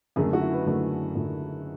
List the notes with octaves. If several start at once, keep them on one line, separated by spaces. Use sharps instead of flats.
F#1 F#2 D3 A3 G#4
F#4
E4
B4
F#1 F#2 D3 A3 A4
F#1 F#2 D3 A3